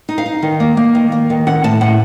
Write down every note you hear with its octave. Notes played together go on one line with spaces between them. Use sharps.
D#4
F5
D#4
D#3
A#3
A#3
D#3
A#3
D#3
C#4 F#5
A2 A5
A2 F#5